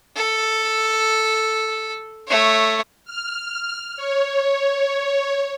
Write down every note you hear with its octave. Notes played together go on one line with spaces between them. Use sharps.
A4
A3 C#5
F6
C#5